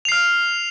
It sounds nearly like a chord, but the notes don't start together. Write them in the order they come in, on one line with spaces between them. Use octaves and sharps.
F7 C7 F6